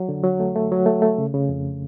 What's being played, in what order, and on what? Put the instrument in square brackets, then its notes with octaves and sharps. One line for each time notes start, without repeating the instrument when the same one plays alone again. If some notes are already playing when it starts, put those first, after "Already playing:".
Already playing: [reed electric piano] F#3
D3
F#3
A3
A3
F#3
A3
A3
C#3
C#3
F2